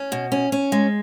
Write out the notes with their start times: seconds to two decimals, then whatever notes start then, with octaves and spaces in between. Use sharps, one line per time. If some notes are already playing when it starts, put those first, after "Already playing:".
Already playing: C#4
0.12 B2
0.32 C#4
0.52 C#4
0.72 G#3